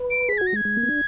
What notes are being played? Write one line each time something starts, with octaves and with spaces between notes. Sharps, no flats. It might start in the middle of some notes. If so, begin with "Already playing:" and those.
Already playing: B4
D7
G#4 B6
F#4 G#6
A#6
G#3 G#6
G#3
A#3
B3
D4